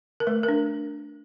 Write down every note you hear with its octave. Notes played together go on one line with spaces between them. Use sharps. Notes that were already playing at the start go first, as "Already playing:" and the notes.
A#4
A3 B4
A#4
D4